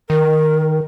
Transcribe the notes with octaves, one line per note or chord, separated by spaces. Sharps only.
D#3 A#4